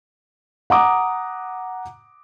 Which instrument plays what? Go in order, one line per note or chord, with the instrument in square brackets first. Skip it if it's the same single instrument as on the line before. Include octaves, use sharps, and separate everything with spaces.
[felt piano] F#5 A#5 D6 D#6